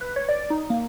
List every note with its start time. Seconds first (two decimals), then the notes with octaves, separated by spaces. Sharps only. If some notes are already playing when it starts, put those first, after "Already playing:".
0.01 B4
0.16 C#5
0.29 D5
0.50 D#4
0.70 A#3